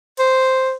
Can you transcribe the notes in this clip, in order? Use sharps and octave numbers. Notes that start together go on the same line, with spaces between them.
C5